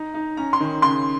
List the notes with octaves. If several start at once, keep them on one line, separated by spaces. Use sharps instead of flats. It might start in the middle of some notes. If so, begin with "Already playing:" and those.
Already playing: D#4 A#5
D#4
C#4 A#5
C6
D#3
C#3 C6